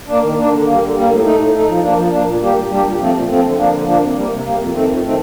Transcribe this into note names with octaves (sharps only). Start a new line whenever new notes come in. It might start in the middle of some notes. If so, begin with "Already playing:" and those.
A#3 D4
D#3
A#3 D4
D3
G3 A#3
D3
G3 A#3
A2
A3 D#4
A2
A3 D#4
F3
A#3 D4
F3
A#3 D4
A#2
G3 A#3 D4 G4
A#2
G3 A#3 D4 G4
A#2
F3 A3 C4
A#2
F3 A3 C4
D3
F3 A#3 D4
D3
F3 A#3 D4
C3
G3 A#3
C3
G3 A#3
F2
D#3 A3 C4
F2
D#3 A3 C4